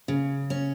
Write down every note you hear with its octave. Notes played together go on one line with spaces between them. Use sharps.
C#3
C#4